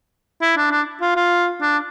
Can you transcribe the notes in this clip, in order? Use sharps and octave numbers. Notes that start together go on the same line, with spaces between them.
E4
D4
D4
F4
F4
D4